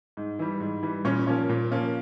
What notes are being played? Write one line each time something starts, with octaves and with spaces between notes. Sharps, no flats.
G#2
E3 G3
G#2
E3 G3
A#2 C#4 C#5
F3 A#3 C#4
A#2
F3 A#3 C#4